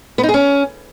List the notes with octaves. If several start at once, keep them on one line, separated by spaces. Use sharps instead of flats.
B3
D#4
G#4
C#4